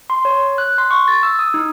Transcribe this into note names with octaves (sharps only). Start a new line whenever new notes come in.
C6
C#5
F#6
C6
C#6
A6
E6
D#6
D#4